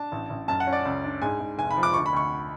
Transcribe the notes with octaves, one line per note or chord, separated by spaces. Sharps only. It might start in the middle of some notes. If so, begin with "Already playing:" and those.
Already playing: D4 A5
A1
A1
F#2 A5
F#5
C#4
D5
C#2
D4
G#2 G#5
G#2
F1 G#5
B5
F3
D6
D2 C#6
B5
D2 C#6